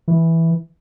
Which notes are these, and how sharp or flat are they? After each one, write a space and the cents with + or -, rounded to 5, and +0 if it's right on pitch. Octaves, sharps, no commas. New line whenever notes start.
E3 -5